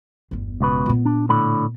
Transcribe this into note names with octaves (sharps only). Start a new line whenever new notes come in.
G1 E2
C#2 B2 B4
A#2 B3
D4
A2 D3 B5